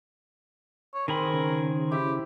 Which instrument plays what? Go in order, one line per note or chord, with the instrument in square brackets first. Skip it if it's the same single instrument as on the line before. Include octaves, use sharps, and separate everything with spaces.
[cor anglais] C#5
[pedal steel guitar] D#3 G#4 B5 [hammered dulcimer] C4 [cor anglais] A#4
[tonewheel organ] C#3
[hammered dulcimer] E4 [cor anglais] G4